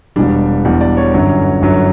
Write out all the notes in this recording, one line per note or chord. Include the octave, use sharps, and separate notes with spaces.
E1 E2 B2 G3 D4
E1 E2 B2 G3
D5
C#5
G1 F#2 D3 F#3 C#4
G1 F#2 D3 F#3 C#4